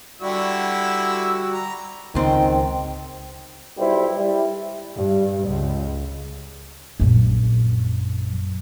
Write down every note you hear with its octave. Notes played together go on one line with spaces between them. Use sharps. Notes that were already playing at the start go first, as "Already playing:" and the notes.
D3 G3 E4 F#4 E6
A#5
C#2 G#2 D#3 C4
B1 G3 E4 C5
G3 E4
G2
C#2
A#1 F#2